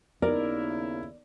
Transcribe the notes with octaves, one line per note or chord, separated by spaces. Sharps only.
D#2 C#3 B3 D#4 E4 A#4 D5